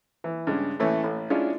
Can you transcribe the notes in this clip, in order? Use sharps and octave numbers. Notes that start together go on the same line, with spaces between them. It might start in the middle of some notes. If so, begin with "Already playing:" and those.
E3
G2 C#3 G#3
A2 E3 A3 C#4
A1 A2
G#3 C#4 D4 E4 F4